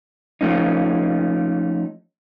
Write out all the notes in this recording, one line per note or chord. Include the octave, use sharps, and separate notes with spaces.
F3 A3 C#4 D#4